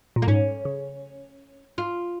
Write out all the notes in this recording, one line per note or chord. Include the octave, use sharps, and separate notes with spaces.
A#2
A#3
G#2 C#4
C#3
F4